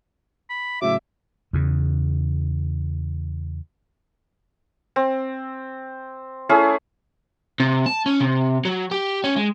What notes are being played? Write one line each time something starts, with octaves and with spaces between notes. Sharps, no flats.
B5
A2 C#3 F#3 E5 D6
E2 C#3
C4
A3 C#4 E4 G#4
C3
A5
C#4
C3
F#3
G4
C#4
G#3